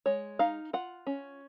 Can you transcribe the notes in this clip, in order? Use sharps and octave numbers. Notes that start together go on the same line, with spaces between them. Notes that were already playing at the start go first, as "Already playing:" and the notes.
G#3 C#5
D#4 F5
F4 F#5
C#4